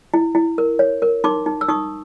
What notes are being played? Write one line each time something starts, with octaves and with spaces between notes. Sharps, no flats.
E4
E4
A#4
C#5
A#4
D#4 C6 D6
D#4
E6
D#4 C#6 D#6